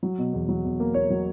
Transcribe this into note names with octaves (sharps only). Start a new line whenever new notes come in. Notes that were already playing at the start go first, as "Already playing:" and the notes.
F#3
B2
E2
F#3
E2
A#3
A#3 C#5
F#3